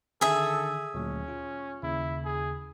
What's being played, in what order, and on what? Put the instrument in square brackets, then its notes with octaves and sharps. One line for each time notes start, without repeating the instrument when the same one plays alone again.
[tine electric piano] D3 D#3 [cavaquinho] G#4 E5 [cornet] A4
[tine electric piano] D2 A#2 F#3 [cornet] C#4
[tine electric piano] F4
[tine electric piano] D#2 C#3 [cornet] E4
[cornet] G#4